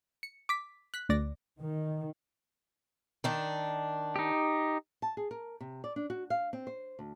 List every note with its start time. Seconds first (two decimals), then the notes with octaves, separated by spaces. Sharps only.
0.23 C#7
0.49 D6 B6
0.94 F#6 B6
1.09 D2 D5 A#6
1.60 D#3
3.24 D#3 D4
4.16 D#4 G4
5.02 A5
5.17 G#4
5.31 A#4
5.61 C3
5.84 D5
5.96 D4
6.10 F#4
6.30 F5
6.53 C4
6.67 C5
6.99 D2